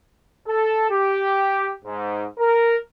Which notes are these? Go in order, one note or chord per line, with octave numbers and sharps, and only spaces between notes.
A4
G4
G#2
A#4